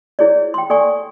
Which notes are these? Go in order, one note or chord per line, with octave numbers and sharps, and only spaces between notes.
E4 G#4 C#5 D5
G5 C6
A4 D5 G#5 C#6